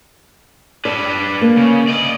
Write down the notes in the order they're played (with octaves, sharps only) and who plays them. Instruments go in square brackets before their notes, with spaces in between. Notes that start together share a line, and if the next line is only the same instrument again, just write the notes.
[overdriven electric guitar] D4 B4 [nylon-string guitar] D5
[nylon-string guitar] A#3
[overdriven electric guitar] C#3
D5 D#5